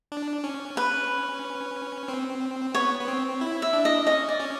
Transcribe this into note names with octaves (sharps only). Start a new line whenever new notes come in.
D4
C#4
B4
C4
B3 C#5
B3
C4
E4
E5
D4
D#5
C#4 D#5
D5
C#4